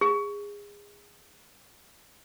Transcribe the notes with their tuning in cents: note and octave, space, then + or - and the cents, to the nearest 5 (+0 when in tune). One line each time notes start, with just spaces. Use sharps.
G#4 -25